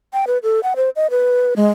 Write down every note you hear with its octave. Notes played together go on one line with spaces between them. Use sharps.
G5
B4
A4
F#5
C5
D#5
B4
G#3